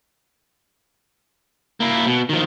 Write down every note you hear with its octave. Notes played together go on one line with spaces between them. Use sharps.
A#3 E4
B2
D#3 F3